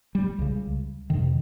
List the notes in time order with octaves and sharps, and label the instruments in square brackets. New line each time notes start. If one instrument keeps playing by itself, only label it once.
[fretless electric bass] G3
C#2 C#3
F2 C3 D#3